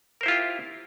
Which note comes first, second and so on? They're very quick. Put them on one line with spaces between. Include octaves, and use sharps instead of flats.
A#4 C5 E4 F4 G4